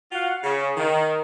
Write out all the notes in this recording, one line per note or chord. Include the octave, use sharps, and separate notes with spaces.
F4 F#4 F5 F#5
C#3
D#3